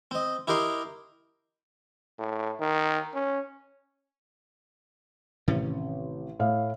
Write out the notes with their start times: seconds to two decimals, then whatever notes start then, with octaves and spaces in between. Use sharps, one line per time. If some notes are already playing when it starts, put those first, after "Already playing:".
0.11 C4 D#5
0.47 E4 G4 A#4 D#5 C6
2.19 A2
2.60 D#3
3.14 C#4
5.48 A1 C3 D#3 C#4
6.39 A2 F5